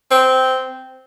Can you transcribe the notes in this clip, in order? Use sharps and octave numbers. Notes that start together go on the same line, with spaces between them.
C4